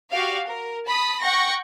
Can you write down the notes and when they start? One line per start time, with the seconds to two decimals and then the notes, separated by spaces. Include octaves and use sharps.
0.11 F#4 G4 D5 F5
0.46 A#4
0.86 A5 B5 D#6 B6
1.21 F#5 G5 C#6 A#6